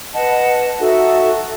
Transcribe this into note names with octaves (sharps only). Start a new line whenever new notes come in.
B4 D#5 F#5 A5
D#4 F#4 A4 E5